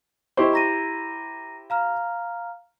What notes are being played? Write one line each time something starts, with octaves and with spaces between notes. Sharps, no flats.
E4 G4 C5 D#5 C#6
A#5 A#6 D#7
F5 A#5 F6